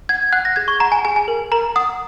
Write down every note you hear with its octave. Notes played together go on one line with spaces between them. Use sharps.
F#5 G#6
F#5 F#6
A#6
G#4 G#6
C#6
F#5 A#5
G#5
G#4 G#5
G#5
A#4
A#4 A#5
F#5 D#6